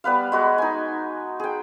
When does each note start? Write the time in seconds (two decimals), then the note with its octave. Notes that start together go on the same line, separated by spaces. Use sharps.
0.04 G3 B3 B4 F5
0.32 G#3 F#4 B4
0.58 D#4 G#5
1.40 G#4 G5